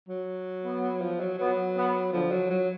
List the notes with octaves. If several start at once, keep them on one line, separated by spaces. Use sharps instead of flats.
F#3
B3
F3
F#3
F#3 B3
B3
D3 F3
F#3
F#3